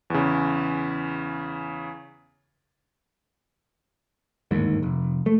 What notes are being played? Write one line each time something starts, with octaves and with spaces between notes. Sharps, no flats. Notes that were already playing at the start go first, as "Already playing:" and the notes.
E2 C#3
G1 D#2 G#2
F1
A3